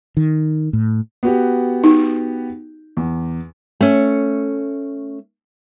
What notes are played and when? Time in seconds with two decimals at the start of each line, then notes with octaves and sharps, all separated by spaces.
0.17 D#3
0.73 A2
1.23 B3 F#4 G4
1.84 D#4
2.97 E2
3.81 A3 C#4